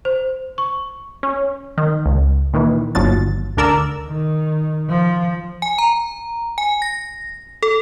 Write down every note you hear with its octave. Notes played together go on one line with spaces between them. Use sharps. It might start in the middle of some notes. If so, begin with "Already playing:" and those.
C5
C#6
C#4
D#3
C#2
A#2 D#3 E3
G1 D#2 F3 F#3 A6
D2 D3 A#4 D5 E6
D#3
F3
G#5
A#5
G#5
A#6
A4